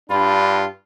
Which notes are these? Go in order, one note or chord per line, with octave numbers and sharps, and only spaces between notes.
G2 D4 F4 B5